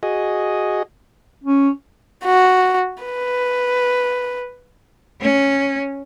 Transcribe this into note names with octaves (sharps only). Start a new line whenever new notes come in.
F#4 G#4 D#5
C#4
F#4
B4
C#4